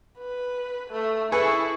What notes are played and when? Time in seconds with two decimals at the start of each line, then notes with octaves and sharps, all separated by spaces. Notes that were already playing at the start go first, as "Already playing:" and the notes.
0.18 B4
0.91 A3
1.32 E4 G#4 A4 B4 C#6